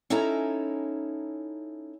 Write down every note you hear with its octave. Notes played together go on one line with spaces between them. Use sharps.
C#4 D#4 E4 A4 G#5 A#5